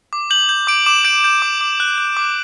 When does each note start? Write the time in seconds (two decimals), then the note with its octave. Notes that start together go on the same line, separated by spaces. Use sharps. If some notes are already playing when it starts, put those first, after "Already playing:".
0.13 D6
0.30 G6 F#7
0.49 G6
0.67 D6 D7
0.86 D6 E7
1.05 G6 D7
1.24 G6
1.42 D6
1.61 D6
1.80 F#6
1.98 F#6
2.17 D6